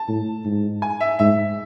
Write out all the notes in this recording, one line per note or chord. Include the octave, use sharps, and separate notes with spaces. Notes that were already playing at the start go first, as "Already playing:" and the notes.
Already playing: A5
A2
G#2
G#5
E5
G#2 E5